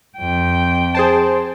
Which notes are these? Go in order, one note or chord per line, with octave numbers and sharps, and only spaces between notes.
F2 G5
G#4 C5 A5